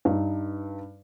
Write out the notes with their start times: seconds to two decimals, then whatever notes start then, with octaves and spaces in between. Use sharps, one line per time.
0.05 G2 D#4